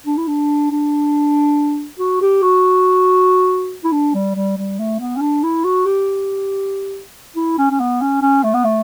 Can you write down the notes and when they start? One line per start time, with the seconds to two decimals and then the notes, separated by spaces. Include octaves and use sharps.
0.06 D4
0.17 E4
0.28 D4
0.71 D4
1.99 F#4
2.21 G4
2.42 F#4
3.84 E4
3.92 D4
4.14 G3
4.35 G3
4.57 G3
4.79 A3
5.00 B3
5.16 C#4
5.21 D4
5.43 E4
5.64 F#4
5.86 G4
7.36 E4
7.58 C#4
7.71 C#4
7.80 B3
8.01 C#4
8.22 C#4
8.43 A3
8.54 B3
8.64 A3